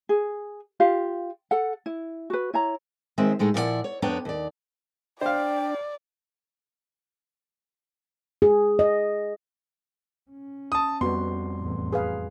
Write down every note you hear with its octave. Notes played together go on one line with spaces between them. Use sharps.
G#4
F4 G4 F5
A4 F#5
E4
F#4 B4
E4 C#5 A#5
D#3 G#3 C4 C#5 E5
A2 G#3 A3 D#4
A#2 F3 E4 F4 D5 F#5
C#5
F2 B3 D4 C#5 G5 A#5
D#2 D5
D4 C5 D5 F5 G5
G#4
D#5
C#4
A5 D#6
F2 G3 B3 F#4 C6
A1 E2
G#4 B4 F5